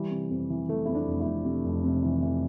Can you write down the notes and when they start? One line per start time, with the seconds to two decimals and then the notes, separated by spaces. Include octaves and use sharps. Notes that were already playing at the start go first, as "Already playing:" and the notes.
Already playing: E3 G3
0.11 C3
0.30 F2
0.50 E3
0.69 E3 A3
0.85 F2 E4
0.95 D4
1.07 F1
1.20 E4
1.26 F2
1.45 C3
1.64 F1
1.84 C3
2.02 E3
2.22 E3